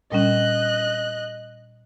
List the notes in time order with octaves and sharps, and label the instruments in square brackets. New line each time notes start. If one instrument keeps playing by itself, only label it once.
[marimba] A#2 G3 C#4 [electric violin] D#5 F#6